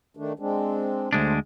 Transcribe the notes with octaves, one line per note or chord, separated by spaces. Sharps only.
D#3 A3 D4
G#3 C4 D4
D2 G#3 A3 D4 C5